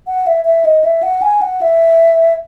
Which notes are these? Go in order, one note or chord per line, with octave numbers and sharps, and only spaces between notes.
F#5
E5
E5
D#5
E5
F#5
G#5
F#5
E5